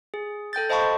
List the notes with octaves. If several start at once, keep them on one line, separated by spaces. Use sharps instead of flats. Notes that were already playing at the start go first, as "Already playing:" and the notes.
G#4
A4 G5 G6 A6
C5 D#5 F5 A5 B5 C#6